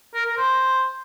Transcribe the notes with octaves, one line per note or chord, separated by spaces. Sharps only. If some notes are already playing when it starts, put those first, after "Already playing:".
A#4
A#4
C5